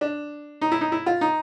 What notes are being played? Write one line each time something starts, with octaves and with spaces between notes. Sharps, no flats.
D4
D#4
E4
D#4
E4
F4
D#4